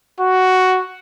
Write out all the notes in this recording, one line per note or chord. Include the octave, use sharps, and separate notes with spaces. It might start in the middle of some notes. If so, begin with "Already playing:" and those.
F#4